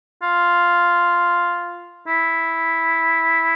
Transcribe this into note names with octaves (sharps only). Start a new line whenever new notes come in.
F4
E4